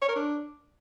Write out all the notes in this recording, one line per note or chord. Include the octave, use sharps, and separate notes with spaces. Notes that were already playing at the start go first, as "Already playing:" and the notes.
C#5
A#4
D4